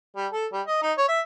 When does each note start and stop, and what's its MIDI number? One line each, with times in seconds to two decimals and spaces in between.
0.16 0.27 55
0.32 0.46 69
0.53 0.62 55
0.67 0.80 75
0.82 0.92 63
0.97 1.05 73
1.08 1.20 76